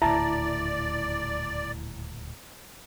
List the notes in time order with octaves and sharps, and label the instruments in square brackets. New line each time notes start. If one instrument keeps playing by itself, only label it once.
[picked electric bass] D#1 D2 A2 [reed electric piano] E4 [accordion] D5 [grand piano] A5 A#5